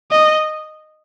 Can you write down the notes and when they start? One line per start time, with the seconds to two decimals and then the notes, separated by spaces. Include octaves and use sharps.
0.11 D#5